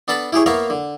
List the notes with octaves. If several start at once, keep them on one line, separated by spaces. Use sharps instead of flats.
B3 D4 A4 A5 B5
E4 G4 G#4 C#5
A#3 B3 A#4 C#5 E5 F5
D3